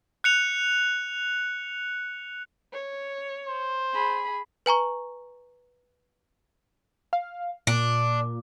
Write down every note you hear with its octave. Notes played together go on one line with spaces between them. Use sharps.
F#6 C#7 F7
C#5
C5
G#4 B5
B4 G#5 A#5 C#6
F5
A#2 D4